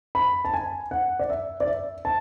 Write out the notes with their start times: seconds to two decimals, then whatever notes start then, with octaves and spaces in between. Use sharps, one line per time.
0.15 B5
0.45 A5
0.54 G#5
0.91 F#5
1.19 D5
1.30 E5
1.60 D5
1.67 E5
2.05 A5